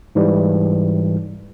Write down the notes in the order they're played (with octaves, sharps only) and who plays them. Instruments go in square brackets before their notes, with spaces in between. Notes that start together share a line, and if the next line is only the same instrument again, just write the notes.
[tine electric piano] G#2 E3 G3